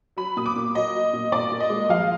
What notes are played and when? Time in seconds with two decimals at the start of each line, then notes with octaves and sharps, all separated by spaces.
0.17 F#3 B5
0.36 A#2 D#6
0.46 D6
0.56 A#2
0.75 F#3 D#5
0.94 F#3
1.13 A#2
1.32 A#2 D5
1.51 A#2
1.60 D#5
1.70 G#3
1.89 F3 F5